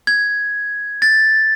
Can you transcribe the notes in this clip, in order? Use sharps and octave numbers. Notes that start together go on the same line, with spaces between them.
G#6
A6